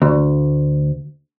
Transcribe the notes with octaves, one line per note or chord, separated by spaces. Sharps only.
D2